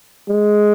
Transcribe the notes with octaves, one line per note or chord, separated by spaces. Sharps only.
G#3